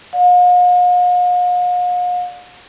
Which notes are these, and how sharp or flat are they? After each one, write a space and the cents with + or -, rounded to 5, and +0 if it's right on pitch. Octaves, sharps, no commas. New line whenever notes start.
D5 +0 F5 +45